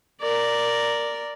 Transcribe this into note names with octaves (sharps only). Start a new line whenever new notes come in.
A#4 D5